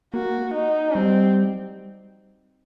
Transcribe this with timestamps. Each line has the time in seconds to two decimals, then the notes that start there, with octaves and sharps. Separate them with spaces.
0.14 A#3 F#4
0.54 D#4
0.95 G3 C4